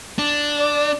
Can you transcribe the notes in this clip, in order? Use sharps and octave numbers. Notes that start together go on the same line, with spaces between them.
D4
D5